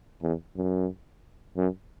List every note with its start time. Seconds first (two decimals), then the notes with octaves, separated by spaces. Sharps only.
0.22 E2
0.56 F#2
1.57 F#2